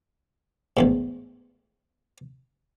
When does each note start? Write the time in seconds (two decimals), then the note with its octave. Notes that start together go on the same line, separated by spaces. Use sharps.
0.77 A1 E2 G#2